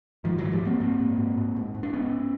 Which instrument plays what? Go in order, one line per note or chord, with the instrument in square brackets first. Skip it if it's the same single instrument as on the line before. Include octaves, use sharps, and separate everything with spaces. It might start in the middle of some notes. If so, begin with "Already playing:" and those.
[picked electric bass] G#2 D#3 F3
G#2 E3 F#3
F3 G3
G#2 A#3 C4
G#2 A#3 C4
G#2
G#2
G#2
G#2
G#2
D4
G#2 B3 C#4